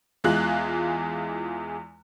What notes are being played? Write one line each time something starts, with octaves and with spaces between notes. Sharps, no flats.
E2 E3 G#3 F4 F#6